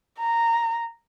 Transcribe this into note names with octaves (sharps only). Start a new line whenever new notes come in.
A#5